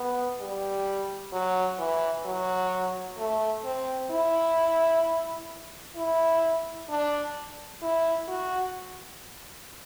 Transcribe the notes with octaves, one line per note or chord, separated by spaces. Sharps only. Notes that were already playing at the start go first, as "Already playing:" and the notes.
Already playing: B3
G3
F#3
E3
F#3
A3
C4
E4
E4
D4
E4
F#4